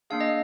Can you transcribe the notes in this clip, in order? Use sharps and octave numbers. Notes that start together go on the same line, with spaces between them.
A#3 D4 G#4 F5
D#5